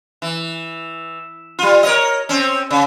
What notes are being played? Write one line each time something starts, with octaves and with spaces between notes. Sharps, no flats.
E3
G3 F4
A#4 C#5 D#5
C4 C#4
C#3